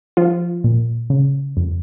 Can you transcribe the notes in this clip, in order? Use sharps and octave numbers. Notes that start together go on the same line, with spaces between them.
F3 F4
A#2
C#3
F2